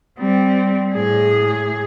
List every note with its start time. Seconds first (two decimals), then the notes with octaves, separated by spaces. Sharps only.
0.20 G3 C4
0.94 A2 G#4